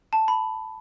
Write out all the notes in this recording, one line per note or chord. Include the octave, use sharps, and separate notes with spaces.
A5
B5